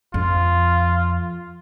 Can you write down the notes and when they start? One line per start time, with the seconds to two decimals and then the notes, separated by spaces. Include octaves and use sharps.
0.14 F2 F4